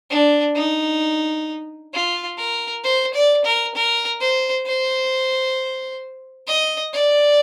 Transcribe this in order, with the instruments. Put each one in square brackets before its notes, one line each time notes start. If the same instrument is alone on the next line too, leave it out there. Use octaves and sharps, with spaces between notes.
[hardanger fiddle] D4
D#4
F4
A#4
C5
D5
A#4
A#4
C5
C5
D#5
D5